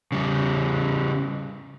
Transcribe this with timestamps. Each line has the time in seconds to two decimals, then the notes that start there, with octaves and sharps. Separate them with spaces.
0.12 C#3 G3